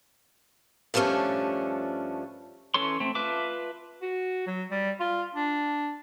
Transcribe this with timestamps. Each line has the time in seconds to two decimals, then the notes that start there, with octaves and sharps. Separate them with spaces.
0.94 G2 F3 A3 A#3 C#4 D4
2.74 E3 C#4 A4 C#5 C6
3.00 A3 C4
3.15 F4 B4 E5 A5 D6
4.02 F#4
4.47 F#3
4.71 G3
5.00 F4
5.35 D4